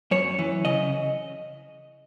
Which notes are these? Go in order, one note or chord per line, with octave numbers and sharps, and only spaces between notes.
F#2 C#5
E3
C#3 D#5